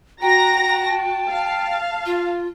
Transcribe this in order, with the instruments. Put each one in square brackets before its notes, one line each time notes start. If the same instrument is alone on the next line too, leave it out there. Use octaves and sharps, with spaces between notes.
[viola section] F#4 [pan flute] G5 [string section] A#5 A#6
[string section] A5
[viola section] F5
[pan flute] F4